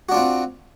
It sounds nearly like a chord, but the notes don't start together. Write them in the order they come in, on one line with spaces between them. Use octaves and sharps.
F#4 D4 F4 C4